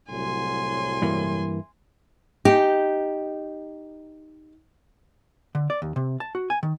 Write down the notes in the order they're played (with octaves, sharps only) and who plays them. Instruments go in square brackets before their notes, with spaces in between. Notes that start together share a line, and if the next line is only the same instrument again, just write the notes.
[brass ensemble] C2 A2 F#3 [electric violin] G#5 C6
[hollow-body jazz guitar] G2 E3 A#3
[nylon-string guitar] D#4 G4
[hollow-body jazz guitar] D3
D5
D#2
C3
A5
F#4
G#5
D#3